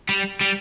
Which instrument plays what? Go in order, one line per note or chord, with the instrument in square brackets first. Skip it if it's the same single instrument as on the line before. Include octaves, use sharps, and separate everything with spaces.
[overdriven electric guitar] G3
G3